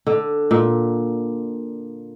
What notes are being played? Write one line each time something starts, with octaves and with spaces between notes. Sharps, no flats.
D3
A#2